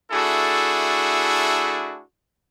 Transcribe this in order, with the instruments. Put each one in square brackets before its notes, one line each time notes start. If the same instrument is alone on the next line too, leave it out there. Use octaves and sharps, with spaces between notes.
[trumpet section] A3 D4 E4 F#4 G#4 A4